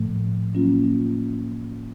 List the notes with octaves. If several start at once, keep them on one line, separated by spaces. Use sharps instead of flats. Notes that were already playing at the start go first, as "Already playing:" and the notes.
Already playing: A2 F3 A3
F#3 A#3 C#4 F4